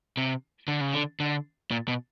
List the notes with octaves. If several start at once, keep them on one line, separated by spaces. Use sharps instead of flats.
C3
D3
C#3
D3
D3
A#2
B2